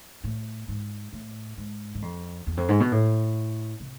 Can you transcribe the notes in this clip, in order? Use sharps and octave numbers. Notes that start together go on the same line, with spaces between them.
A2
G#2
A2
G#2
G#2
F2
E2
F2
G#2
B2
A2
C3